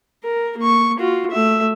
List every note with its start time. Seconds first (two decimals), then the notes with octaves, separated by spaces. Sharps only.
0.24 A#4
0.58 A#3 C#6
0.98 F4 F#4
1.31 A3 E5